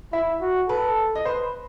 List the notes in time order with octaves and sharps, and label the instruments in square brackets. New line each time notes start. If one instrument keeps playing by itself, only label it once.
[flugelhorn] E4 [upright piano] E5
[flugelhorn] F#4
[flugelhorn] A4 [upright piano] B4
[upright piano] D#5
[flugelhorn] B4 [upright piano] C5